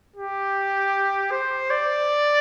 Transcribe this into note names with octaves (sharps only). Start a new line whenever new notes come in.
G4
C5
D5